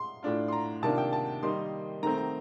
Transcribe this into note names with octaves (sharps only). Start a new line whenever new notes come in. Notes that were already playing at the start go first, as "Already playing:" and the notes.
Already playing: C6
A2 A3 D4 F4
C6
A#5
C3 D#3 A#3 D4 F4 A5
G5
A5
D#3 G3 A#3 D#4 C6
D#3 A3 C4 A#5
A#5